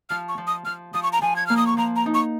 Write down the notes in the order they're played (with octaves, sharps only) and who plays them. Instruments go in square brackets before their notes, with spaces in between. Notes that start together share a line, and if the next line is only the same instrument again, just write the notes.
[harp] F3 [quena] F6
[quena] C#6
[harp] F3
[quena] D#6
[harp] F3 [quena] F6
[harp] F3 [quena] D#6
[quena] C#6
A#5
[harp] F3 [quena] G#5
[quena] G#6
[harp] A#3 [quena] F6
[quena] D#6
C#6
[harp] F3 [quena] A#5
[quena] A#5
[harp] D#4
[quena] C#6